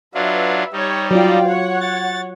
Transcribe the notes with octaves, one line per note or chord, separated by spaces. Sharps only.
F#3 D4 F4 B4 E5
G3 D#4 G4 C#5
F#3 F4 D5 F5 G5
C#5 F#5
A6